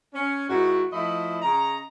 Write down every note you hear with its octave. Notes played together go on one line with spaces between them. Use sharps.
C#4
G#2 D#3 E4 F#4
F3 A3 E4 D#5 B5
C#3 D#5 A#5